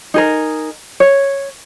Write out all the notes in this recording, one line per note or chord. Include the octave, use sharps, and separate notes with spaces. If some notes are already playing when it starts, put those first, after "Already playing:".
D#4 G#4 A#4
C#5